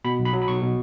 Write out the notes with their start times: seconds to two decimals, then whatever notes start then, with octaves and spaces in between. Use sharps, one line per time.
0.05 B2 B5
0.19 B1
0.25 B5
0.33 F#3
0.42 B5
0.48 B1 C#6
0.62 B2